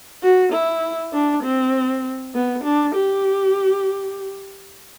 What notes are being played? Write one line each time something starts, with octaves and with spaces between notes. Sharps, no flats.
F#4
E4
D4
C4
B3
D4
G4